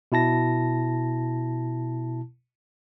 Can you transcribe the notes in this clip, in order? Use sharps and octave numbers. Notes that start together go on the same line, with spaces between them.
B2 E4 A5 A#6